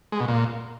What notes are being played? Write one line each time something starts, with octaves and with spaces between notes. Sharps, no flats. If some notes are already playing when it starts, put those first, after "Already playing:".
G#3
B2
A#2